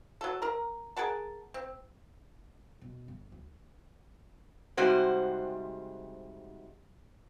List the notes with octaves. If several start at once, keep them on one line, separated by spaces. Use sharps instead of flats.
F#3 A4
A#4 A#5
G#4 A#4 F#5 A5
C4
B2
G1
D2
G#2 C3 G3 F#4 C5